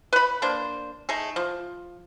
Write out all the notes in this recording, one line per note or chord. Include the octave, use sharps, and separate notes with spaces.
B4 B5
A#3 D4 C5
A3 D#4 G#4
F3